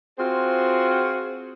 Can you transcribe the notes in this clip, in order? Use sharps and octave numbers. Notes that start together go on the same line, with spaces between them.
C4 F4 F#4 G#4 C5